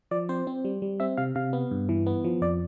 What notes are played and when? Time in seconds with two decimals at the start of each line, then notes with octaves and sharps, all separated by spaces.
0.11 F3 D5
0.29 C4 C5
0.47 C4
0.65 G3
0.82 G3
1.00 C4 E5
1.17 C3 F5
1.35 C3 F5
1.53 B3
1.71 G2
1.89 E3
2.06 B3
2.24 F3
2.42 F2 D5